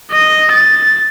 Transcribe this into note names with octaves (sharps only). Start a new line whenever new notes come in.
D#5
A6